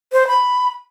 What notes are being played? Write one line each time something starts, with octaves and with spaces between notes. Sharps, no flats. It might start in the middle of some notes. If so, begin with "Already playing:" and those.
C5
B5